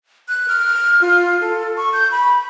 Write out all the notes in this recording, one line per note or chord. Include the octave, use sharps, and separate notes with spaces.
F#6
F6
F4
A4
C#6
G6
B5